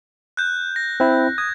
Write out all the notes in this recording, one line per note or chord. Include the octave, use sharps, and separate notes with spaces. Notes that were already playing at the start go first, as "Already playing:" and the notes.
F#6 G6
A#6
C4 E4
D#6 G#6